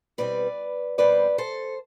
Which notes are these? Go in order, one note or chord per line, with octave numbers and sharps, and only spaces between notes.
E2 B2 G3 C4 B4 D5
E2 B2 G3 C4 B4 D5
A4 C5